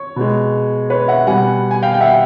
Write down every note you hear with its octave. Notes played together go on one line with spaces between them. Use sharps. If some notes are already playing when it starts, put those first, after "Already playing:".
Already playing: C#5
B2 G#3
B4 C#5
E5 F#5
B2 G3 F#5 G#5
G#5
F5 G5
G5
E5 F#5